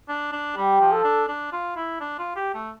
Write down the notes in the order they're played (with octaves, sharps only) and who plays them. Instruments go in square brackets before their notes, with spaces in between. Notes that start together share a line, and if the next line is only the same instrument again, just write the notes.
[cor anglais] D4
D4
[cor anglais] G3 [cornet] G4
[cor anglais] F3
[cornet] A4
[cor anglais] D4
D4
F4
E4
D4
F4
G4
A3